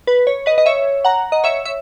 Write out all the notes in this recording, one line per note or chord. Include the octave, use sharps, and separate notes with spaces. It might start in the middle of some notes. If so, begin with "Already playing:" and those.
B4
C#5
B4 D#5
D#5
C#5 E5
F#5 A#5
D#5
C#5 E5
E5